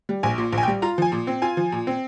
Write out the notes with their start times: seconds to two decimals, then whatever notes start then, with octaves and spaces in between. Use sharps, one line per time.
0.09 G3
0.23 A#1 G#5
0.38 A#2
0.52 A#1
0.58 G#5
0.63 G5
0.68 G3
0.82 F4 A#5
0.98 F3 G#5
1.12 A#2
1.27 C4
1.42 F4 G#5
1.57 F3
1.72 A#2
1.87 C4